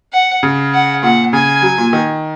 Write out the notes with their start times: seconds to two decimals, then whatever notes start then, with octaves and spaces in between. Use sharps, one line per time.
0.13 F#5
0.43 C#3
0.73 F#5
1.03 A#2 F#5
1.33 C#3 G#5
1.62 F#3
1.78 A#2
1.93 D#3